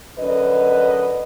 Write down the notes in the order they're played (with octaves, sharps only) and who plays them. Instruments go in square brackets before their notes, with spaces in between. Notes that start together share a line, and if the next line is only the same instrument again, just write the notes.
[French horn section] F#2 D3 B4 D#5